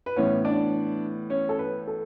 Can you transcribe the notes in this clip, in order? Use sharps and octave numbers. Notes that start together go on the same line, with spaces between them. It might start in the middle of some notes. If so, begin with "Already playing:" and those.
B4
A2 E3 B3 C#4 C#5
D4 D5
C#4 C#5
A4
B4
A4